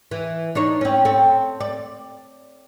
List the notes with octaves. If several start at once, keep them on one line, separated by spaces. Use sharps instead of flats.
E3
D4 D#4 C#5
C4 C#4
C4 A4
D5